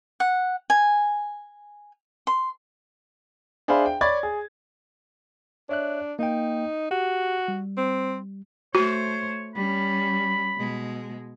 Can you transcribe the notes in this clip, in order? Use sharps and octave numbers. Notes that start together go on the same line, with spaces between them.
F#5
G#5
C6
D4 G#4 C5 E5 F5 B5
G5
C#5 D5 B5 C#6 G#6 A6
G#4
D4 C#5 E5 F#6
A#3 D#4 G5
F#4 G4
G3
C4
A3 F#4 C5 C#5
G3 C#4 B5
B2 G#3